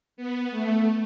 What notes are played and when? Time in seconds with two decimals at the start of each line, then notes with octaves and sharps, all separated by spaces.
0.17 B3
0.51 A3